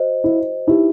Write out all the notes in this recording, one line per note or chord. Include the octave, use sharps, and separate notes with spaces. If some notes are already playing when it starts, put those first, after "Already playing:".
Already playing: F#4 C5 D#5
E4
D#4 E4 G4 B4